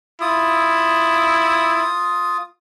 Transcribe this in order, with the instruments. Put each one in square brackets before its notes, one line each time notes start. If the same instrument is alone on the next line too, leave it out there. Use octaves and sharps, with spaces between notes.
[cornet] E4 [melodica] F4 D#6